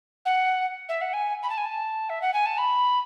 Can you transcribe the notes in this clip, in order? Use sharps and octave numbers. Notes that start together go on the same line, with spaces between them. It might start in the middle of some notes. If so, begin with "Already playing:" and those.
F#5
E5
F#5
G#5
B5
A5
G#5
A5
E5
F#5
G#5
A5
B5